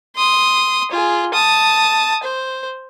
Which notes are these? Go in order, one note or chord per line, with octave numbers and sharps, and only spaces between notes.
C6 D#6
F4 G#4
A5 D#6
C5